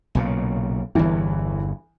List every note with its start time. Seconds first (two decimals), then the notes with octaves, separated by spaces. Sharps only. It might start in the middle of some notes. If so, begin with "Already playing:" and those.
0.15 B1 A#2 C#3
0.95 G1 E2 E3